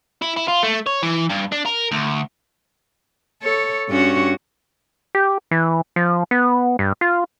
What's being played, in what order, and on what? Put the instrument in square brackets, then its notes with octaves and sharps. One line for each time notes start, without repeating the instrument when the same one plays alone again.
[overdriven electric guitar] E4
E4
F4
A3
C#5
E3
G2
D4
A#4
D2
[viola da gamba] A4 C#5
G2 C#4 F#4
[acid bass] G4
E3
F3
B3
G2
F4